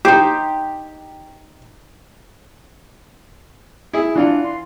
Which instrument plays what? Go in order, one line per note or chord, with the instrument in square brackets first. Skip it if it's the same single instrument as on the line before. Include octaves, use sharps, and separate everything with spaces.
[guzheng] D#4 C5 [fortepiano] G4
[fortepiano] E4 G#4
[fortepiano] E3 F4 F#5 [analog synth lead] D4
[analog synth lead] C6